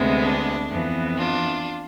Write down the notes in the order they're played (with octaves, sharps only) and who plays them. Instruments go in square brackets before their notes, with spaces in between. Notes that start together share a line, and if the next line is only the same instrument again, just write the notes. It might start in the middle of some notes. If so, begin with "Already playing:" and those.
Already playing: [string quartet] D2 C3 G#3 B3
D4
F2 E3 B3
D4 F4